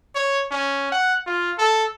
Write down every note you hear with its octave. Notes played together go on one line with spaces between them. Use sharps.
C#5
C#4
F#5
F4
A4